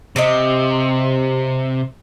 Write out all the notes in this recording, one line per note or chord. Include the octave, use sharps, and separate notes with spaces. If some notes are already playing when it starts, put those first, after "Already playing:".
C3 C4 G4 D#5